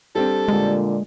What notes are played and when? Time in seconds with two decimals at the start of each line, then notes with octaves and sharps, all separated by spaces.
0.15 G3 C4 D4 A4
0.48 A#2 D3 G#3